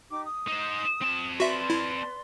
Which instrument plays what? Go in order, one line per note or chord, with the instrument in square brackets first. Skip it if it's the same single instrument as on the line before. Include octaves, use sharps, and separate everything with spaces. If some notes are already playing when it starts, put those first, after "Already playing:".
[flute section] D#4 G4 D6
D#6
[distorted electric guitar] D#4 C5
C4 A5
[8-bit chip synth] F#4 E5 [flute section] B4 D5 C6
[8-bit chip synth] E4